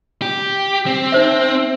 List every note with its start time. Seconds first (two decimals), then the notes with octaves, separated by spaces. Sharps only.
0.22 G4
0.86 C4
1.12 D#4 C5 E5